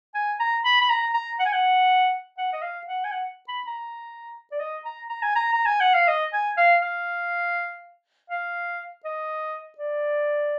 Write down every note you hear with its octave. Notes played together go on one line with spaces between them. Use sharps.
G#5
A#5
B5
B5
A#5
A#5
F#5
G#5
F#5
F#5
D#5
F5
F#5
G#5
F#5
B5
A#5
D5
D#5
A#5
A#5
G#5
A#5
A#5
G#5
F#5
F5
D#5
G#5
F5
F5
F5
D#5
D5